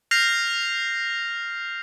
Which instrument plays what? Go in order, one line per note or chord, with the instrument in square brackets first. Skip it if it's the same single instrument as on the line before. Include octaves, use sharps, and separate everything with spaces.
[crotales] F6 G6 A#6 C7 F7